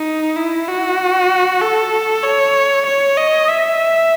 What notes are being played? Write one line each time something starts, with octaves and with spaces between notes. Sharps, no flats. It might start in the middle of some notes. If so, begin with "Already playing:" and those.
Already playing: D#4
E4
F#4
A4
C#5
C#5
D#5
E5